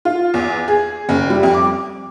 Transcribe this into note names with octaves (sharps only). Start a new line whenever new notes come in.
F4
E2
G#4
F#1
G3
F2
D6